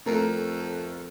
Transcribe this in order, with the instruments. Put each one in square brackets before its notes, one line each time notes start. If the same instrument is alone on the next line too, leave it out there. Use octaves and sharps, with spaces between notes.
[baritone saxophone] F2 [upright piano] A3 A#4